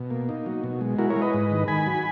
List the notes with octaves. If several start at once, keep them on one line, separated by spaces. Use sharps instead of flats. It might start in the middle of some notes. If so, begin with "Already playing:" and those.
Already playing: B2
A#3
D#4
F#3
B2
G#3
E4 F#4 A#4
A#4 C#5
G#3
B4 D#5
G#2
D#3
D#3 G#5 B5
F#3